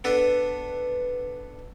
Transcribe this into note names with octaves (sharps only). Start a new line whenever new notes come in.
B3 D4 A4 B4